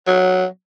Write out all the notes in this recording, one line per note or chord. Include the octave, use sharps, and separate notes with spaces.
F#3